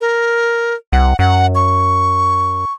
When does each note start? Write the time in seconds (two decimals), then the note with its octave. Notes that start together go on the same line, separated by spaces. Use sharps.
0.01 A#4
0.93 C2 F#5
1.19 F#2 F#5
1.55 C#6